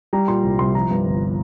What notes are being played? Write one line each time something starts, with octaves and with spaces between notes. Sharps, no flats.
G3 A#5
A#2 C6
C2
C2 C6
F3 A#5
G2
G1